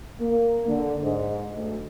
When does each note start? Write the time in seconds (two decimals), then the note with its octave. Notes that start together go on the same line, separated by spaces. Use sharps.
0.20 A#3
0.69 D3
1.02 G#2
1.54 D2